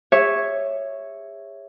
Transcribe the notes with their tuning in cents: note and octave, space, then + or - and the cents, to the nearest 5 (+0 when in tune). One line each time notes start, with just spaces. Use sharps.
G#4 -40 C#5 -5 E5 +0